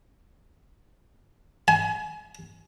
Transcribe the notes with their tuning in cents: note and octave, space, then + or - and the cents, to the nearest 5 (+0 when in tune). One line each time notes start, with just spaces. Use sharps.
G#5 +35